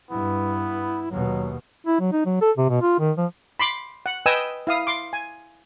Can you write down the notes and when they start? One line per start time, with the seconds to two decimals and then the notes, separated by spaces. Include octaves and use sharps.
0.11 G2 B3 E4
1.11 D#2 B2 F#3
1.87 E4
2.00 F#3
2.12 D#4
2.25 F#3
2.41 A4
2.57 C3
2.69 B2
2.82 F4
3.00 D#3
3.17 F3
3.59 B5 C6 D6
4.06 F#5
4.26 B4 D#5 G5 G#5 D#6 E6
4.67 E4 F5 D#6
4.87 C6 D6
5.13 G#5